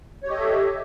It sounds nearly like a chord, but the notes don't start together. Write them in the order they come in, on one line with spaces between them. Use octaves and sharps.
C#5 G4 D#5 A4 E5